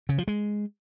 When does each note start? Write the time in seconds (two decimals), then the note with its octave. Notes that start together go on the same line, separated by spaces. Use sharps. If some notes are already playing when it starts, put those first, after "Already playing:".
0.09 C#3
0.18 F3
0.28 G#3